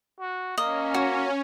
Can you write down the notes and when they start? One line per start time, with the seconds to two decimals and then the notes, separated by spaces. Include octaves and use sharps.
0.20 F#4
0.58 A#3 C#4 D#5
0.94 F#4